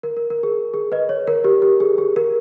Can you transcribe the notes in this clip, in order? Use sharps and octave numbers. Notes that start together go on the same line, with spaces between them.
A#4
A#4
A#4
G#4
G#4
B4 D#5
C#5
A#4
G4
G4
G#4
G#4
A#4